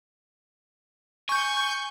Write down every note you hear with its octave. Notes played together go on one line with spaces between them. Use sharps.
G#5 C#6 G6